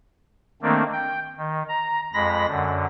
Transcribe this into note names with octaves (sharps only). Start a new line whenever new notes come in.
D#3 A3 A#3 C4 D4
G5
D#3
A#5
F2 G#3 B5 A#6
F#2 D3